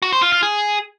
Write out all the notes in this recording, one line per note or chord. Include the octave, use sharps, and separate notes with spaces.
F#4
C5
F4
F4
G#4